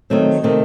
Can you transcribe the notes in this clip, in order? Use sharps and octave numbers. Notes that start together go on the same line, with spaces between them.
D#3 F#3 A3 C4
C3 D#3 A3 C4